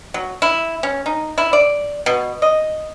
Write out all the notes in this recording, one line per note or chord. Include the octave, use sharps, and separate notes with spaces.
F#3
E4
C#4
D#4
E4
D5
B2
D#5